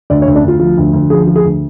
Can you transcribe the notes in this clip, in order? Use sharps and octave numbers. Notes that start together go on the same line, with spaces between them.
D2 D5
C#5
D2
D4
D2 F4
F3 F4
D2
D2
F3 G#4
F3
G#4
D2